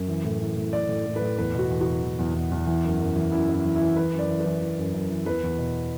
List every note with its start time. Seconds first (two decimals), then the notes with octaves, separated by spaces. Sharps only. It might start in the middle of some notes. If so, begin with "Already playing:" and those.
Already playing: F#2
0.08 E3
0.25 A2
0.40 E3
0.57 A2
0.73 A2 D5
0.89 A2
1.06 A2
1.16 B4
1.22 A2
1.38 E2 B4
1.54 B2 F#4
1.70 E2
1.81 E2 F#4
2.02 E2
2.19 E2
2.35 E2
2.52 E2
2.67 E3
2.84 F#2
3.00 F#2
3.16 E3
3.32 F#2 E4
3.49 F#2
3.54 E4
3.65 E3
3.75 E4
3.81 E3
3.96 E3 B4
4.13 F#2
4.19 D5
4.29 E3
4.40 B4
4.45 E3
4.62 E3
4.78 F#2
4.94 F#2
5.11 E3
5.26 E2 B4
5.43 E2
5.58 B2